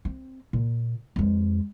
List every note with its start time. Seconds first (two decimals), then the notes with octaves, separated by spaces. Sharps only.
0.05 C4
0.53 A#2
1.16 F2 G#3